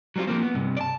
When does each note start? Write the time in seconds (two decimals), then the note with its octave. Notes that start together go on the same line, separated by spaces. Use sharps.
0.16 F#3 G3 B3 C4 F4
0.27 F3 G3 A#3 C4
0.42 B3
0.55 G2 C3
0.77 D5 A5